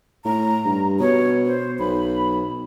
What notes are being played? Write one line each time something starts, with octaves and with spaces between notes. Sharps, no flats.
A2 A#5
G2
B2 C#5
C5
B1 B5